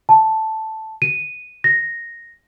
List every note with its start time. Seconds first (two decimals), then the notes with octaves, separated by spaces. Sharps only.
0.09 A5
1.02 D#7
1.64 A#6